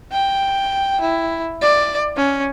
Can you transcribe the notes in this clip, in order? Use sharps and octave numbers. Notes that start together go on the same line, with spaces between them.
G5
E4
D5
C#4